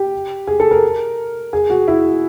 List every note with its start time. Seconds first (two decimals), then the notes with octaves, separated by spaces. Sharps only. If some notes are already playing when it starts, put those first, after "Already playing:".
Already playing: G4
0.47 G#4
0.60 A4
0.71 A#4
1.53 G#4
1.70 F#4
1.88 E4